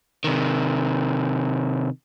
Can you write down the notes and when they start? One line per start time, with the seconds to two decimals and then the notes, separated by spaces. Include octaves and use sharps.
0.24 C3 D#3